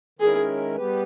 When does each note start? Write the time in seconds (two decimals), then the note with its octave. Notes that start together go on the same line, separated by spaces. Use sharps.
0.19 D#3 G#3 C#4 E4 G#4 A#4
0.75 G3 B3 G4 B4